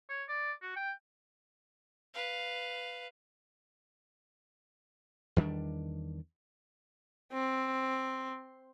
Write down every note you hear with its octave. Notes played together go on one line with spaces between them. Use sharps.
C#5
D5
F#4
G5
B4 F5
E2 D#3 G3 D4
C4